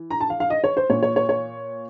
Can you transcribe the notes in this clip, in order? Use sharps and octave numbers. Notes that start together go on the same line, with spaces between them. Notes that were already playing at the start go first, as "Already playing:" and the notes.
Already playing: E3
A#5
A5
F5
F5
D#5
C#5
C5
A#2 C#5
C#5
C#5
C#5